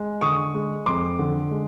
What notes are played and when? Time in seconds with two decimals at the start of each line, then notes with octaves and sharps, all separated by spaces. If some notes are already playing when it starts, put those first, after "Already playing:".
Already playing: G#3
0.21 D3 C#6 D#6
0.54 G#3
0.86 F2 C6 D6
1.19 D3
1.51 G#3